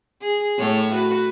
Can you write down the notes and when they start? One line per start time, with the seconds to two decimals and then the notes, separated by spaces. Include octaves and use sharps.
0.22 G#4
0.58 A2 A3 C#5
0.94 F#4 B4